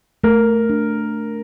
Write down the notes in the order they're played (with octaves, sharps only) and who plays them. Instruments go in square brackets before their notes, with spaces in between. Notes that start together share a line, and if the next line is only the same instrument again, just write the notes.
[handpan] A3 [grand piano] A#4
[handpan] D4